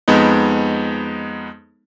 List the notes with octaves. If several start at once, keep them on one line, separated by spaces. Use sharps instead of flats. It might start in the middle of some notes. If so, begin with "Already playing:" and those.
F2 G#3 B3 D#4